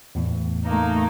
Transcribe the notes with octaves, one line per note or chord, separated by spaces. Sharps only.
E2 A2 E3
A3 A#3 D#4